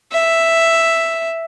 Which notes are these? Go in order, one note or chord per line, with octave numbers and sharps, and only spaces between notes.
E5